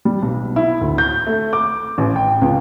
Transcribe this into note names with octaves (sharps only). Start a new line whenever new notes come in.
G3
B1
E4
D2
G6
A3
D6
A1
G5
C#2